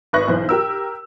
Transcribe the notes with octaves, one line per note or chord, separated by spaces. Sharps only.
G#1 B4 E5 C#6 F#6 A#6
B1 E3 C5
G4 A#4 E6